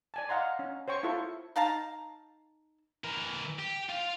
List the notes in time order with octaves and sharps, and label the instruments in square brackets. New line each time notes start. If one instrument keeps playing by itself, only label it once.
[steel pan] D5 G#5 A5
D#5 F5 F#5 A#5 C6
C#4
C5 C#5 G5 C#6
E4 F4 A4 C5 C#6
[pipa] D#4 F5 A5 A#5
[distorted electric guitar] E3 A#4
G4
F4 F5